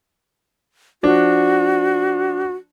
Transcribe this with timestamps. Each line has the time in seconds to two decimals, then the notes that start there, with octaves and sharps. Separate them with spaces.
1.03 F3 D4 F#4